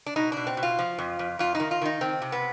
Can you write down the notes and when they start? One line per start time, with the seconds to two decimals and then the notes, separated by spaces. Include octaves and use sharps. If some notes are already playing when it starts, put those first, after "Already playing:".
0.06 D4
0.16 B2 D#4
0.32 B2 D4
0.47 C4
0.57 B2
0.63 F4
0.79 F3
0.99 F2
1.19 F2
1.39 F2 F4
1.55 D#4
1.60 D#3
1.71 F4
1.82 D#3 D#4
2.01 D#3 C4
2.22 C3
2.32 B3